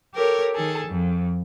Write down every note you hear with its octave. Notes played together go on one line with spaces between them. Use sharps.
G4 A4 A#4 C#5
D#3 G#4 A4
F2